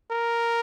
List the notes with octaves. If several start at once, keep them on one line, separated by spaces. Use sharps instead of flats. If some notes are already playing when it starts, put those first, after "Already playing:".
A#4